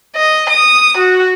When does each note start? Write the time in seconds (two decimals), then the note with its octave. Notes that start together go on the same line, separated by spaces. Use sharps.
0.16 D#5
0.50 D#6
0.97 F#4